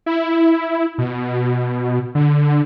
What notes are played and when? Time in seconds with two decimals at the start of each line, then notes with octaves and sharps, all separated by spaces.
0.06 E4
0.98 B2
2.15 D3